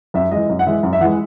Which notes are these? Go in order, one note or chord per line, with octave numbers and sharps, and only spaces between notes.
F#2 E5
E3 G#3 D#5
F#2
F#5
E3 G#3 E5
F#2
E5
E3 G#3 F#5